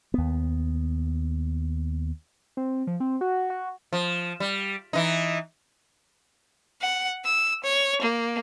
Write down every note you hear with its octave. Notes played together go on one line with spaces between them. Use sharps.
D#2 B3
C4
F3
C4
F#4
F#4
F3
G3
E3 D#4
F#5
E6
C#5
A#3